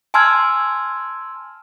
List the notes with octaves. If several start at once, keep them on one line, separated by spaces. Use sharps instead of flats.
G#5 A5 C6 E6 F6 G#6